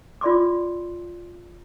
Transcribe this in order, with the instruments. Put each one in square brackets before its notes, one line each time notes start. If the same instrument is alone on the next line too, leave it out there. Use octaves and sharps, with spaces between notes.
[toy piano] F4 D5 C6 D6